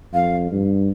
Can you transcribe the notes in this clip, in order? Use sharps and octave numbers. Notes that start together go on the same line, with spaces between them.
F2 F5
G2